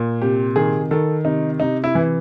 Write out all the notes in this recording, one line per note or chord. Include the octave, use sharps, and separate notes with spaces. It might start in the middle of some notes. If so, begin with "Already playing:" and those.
Already playing: A#2
C3 G4
D#3 G#4
D#3 A4
C3 D#4
C3 D#4
E4
E3